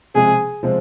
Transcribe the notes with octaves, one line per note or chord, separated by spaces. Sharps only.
C3 F3 G#3 C4 G#4
C3 F3 G#3 C4